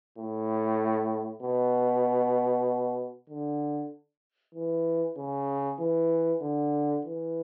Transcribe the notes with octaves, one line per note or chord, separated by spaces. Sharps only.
A2
B2
D3
E3
C#3
E3
D3
E3